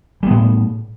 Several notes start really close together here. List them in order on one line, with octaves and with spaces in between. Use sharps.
G3 B3 A2